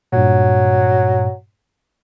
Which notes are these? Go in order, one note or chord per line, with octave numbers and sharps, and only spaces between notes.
G2 A#2 F#3